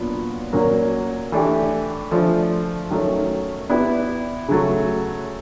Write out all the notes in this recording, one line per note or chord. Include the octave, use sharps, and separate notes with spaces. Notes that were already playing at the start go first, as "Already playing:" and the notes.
Already playing: A#2 F#3 B3 D4 F4
A#2 F#3 A#3 C#4
E3 A3 D4 G4
F3 A3 D4
D#3 F#3 A3 C#4
B3 E4 G4 B4 D5
C#3 F#3 A3